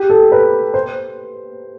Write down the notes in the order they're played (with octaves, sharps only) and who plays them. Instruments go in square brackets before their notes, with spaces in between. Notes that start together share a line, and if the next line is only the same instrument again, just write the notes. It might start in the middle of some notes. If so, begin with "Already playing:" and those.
Already playing: [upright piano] G4
A4
B4
C5